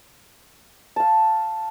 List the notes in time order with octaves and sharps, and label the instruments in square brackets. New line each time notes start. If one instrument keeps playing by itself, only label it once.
[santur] F5 A5